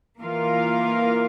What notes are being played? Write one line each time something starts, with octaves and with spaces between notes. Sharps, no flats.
E3 A#3 F4 A#4 F5